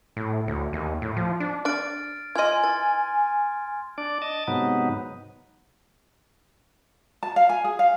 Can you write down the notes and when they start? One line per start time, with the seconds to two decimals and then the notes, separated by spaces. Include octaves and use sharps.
0.17 A2
0.48 D2
0.73 D#2
1.02 A2
1.16 F3
1.40 D4
1.65 D4 D5 F6 A6 D7
2.35 F4 D#5 G#5 C6 F6 G#6
2.64 E3 A6
3.98 D4 D5
4.22 D#5 A5
4.48 G#2 C3 F#3 B3 D#4
7.23 A5
7.36 F5
7.49 G#5
7.64 G#4
7.79 F5